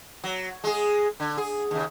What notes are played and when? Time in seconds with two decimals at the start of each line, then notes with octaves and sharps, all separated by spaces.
0.24 F#3
0.64 G#3 G#4
1.20 D3
1.37 G#4
1.71 D#2 C#3